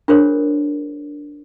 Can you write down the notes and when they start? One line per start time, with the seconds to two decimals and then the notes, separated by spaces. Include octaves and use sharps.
0.08 D4 F4 G#4 A#4 C5 C#5